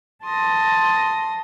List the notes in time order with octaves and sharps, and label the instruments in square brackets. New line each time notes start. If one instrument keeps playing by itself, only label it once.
[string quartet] A5 C6 D#6 A#6